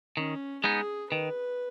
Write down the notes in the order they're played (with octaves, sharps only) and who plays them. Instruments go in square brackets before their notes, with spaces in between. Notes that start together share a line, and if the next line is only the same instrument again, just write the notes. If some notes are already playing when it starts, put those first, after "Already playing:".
[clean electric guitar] D#3 [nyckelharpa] C#4
[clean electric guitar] G#3 B3 D#4 [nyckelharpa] G#4
[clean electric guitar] D#3 [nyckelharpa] B4